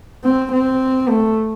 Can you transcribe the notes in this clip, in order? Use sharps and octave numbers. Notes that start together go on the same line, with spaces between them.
C4
C4
A3